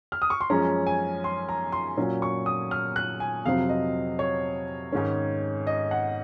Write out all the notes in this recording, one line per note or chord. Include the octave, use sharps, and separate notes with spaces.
F6
D#6
C#6
C6
F#2 F3 G#3 C#4 A#5
G#5
C6
A#5
C6
A#2 F#3 C#4
C#6
D#6
F6
F#6
G#5
F2 C3 F#3 C4 F5
D#5
C#5
G#2 D#3 G#3 C#4
D#5
F#5